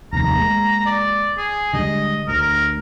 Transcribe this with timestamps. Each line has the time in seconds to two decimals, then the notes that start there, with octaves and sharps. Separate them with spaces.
0.13 F1 D#2 A#5
0.36 G#3 A#3
0.86 D5
1.38 G#4
1.73 D3 G3 G#3 D#5
2.28 D2 A#4